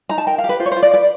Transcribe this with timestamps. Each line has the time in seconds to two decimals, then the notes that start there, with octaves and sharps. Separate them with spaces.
0.09 D#4 A#5
0.18 A5
0.27 A#4 G5
0.38 F5
0.44 G4
0.49 B4
0.60 F4 C5
0.66 C#5
0.72 C5
0.76 F4
0.83 D5
0.94 B4 D5